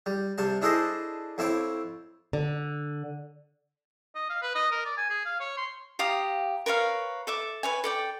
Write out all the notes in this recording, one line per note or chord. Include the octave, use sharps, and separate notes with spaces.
G3
C3 G3 A5
D4 E4 G#4 A4 C5 D#5
F2 C4 E4 C#5 D6
D3
D#5
F5
B4
D#5
A#4
D5
G#5
G#4
F5
C#5
C6
G4 F5 A#5 D#6
A#4 B4 C#5 F5
A4 E5 D6
B4 C#5 G#5
A4 D5 G5